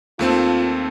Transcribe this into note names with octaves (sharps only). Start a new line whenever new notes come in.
D#2 A3 C4 F4